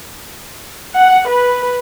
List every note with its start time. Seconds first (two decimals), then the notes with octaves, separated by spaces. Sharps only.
0.95 F#5
1.28 B4